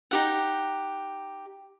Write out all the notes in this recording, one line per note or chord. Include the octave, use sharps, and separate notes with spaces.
D#4 G4 F#5